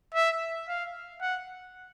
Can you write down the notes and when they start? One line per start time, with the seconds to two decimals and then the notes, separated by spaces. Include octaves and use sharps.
0.14 E5
0.68 F5
1.21 F#5